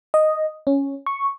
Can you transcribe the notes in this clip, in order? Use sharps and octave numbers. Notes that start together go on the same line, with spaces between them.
D#5
C#4
C#6